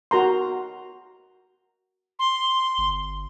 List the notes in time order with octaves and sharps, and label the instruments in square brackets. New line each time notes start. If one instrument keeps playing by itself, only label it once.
[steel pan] F#4 A#4 A#5 C6
[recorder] C6
[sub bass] G1